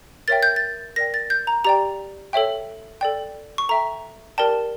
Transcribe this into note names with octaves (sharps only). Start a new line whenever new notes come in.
A#4 C#5 E5 G5 A6
G6
A6
A#4 D5 G5 A#6
A6
G6
A#5
G4 D5 G5 A#5
A4 C#5 E5 G5
A4 D5 G5
C#6
A4 E5 G5 A#5
G4 A#4 D5 G5 A5